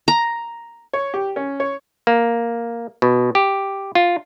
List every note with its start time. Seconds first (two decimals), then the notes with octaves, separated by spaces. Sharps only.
0.08 A#5
0.93 C#5
1.14 G4
1.36 C#4
1.60 C#5
2.07 A#3
3.02 B2
3.35 G4
3.95 F4